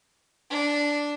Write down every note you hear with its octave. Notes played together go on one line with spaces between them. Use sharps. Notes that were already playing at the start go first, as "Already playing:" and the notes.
D4